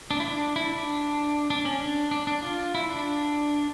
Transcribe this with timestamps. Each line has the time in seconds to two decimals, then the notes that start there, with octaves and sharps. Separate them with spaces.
0.11 D4
0.20 E4
0.25 D4
0.56 E4
0.72 D4
1.50 D4
1.65 C#4
1.81 D4
2.11 D4
2.27 D4
2.43 F4
2.75 E4
2.90 D4